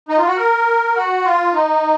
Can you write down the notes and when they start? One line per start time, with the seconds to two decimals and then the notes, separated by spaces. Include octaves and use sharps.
0.09 D#4
0.18 F4
0.27 F#4
0.37 A#4
0.96 F#4
1.24 F4
1.54 D#4